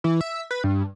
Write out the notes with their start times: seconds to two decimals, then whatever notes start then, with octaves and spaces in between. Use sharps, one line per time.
0.04 E3
0.21 E5
0.51 B4
0.64 G2